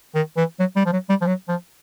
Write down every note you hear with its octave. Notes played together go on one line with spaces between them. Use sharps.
D#3
E3
F#3
G3
F3
F#3
G3
F3
F#3
F3